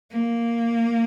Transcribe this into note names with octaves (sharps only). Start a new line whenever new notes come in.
A#3